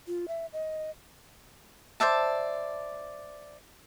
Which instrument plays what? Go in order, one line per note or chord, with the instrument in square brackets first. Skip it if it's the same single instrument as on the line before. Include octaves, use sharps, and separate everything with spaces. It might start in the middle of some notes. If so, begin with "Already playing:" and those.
[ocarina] F4
E5
D#5
[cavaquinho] C5 D5 E5 A5